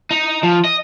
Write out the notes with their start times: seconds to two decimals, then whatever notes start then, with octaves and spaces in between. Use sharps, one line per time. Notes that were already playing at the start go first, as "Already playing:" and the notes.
0.11 D#4
0.43 F3
0.65 D#5